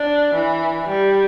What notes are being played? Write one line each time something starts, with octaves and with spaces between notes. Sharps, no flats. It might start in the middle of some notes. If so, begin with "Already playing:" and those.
Already playing: D4
E3
G3